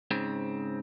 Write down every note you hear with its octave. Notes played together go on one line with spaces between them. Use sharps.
G#2 C#3 C4